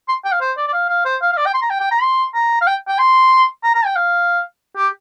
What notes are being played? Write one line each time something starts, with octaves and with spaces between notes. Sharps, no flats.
C6
G5
F5
C5
D5
D5
F5
F5
C5
F5
F5
D5
G5
C6
A#5
G5
G5
A#5
C6
A#5
F5
G5
G5
C6
A#5
A#5
G5
F5
G4